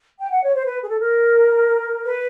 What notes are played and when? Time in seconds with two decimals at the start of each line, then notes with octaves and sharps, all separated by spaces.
0.19 G5
0.30 F#5
0.42 C#5
0.54 C5
0.65 B4
0.83 G#4
0.89 A4
1.00 A#4
2.04 B4